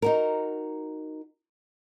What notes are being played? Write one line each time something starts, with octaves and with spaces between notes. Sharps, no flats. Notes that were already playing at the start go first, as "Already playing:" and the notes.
D#4 F#4 A#4